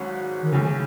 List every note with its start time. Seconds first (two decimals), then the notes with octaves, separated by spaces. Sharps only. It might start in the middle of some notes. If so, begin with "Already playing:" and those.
Already playing: G#1 G#2 F#3 C#4 F#4
0.42 D#3
0.52 B1 A2 C#3 G#3